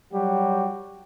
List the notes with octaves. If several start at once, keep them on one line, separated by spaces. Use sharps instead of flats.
F#3 G3 F#4 G4